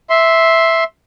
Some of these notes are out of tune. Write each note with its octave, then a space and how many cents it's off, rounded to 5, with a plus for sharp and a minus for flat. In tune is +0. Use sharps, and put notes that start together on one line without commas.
E5 -5 C6 +5